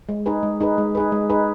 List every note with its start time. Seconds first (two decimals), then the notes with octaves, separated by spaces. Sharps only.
0.09 G#3
0.26 D#4 G#4 B4
0.43 G#3
0.61 D#4 G#4 B4
0.78 G#3
0.95 D#4 G#4 B4
1.12 G#3
1.30 D#4 G#4 B4